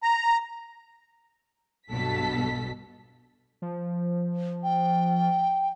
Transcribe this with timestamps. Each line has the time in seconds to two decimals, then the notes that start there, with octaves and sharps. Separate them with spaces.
0.03 A#5
1.91 B1 G2 B2 A4 B6
3.62 F3
4.63 G5